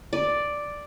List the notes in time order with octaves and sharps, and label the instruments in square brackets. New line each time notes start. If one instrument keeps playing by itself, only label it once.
[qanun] D5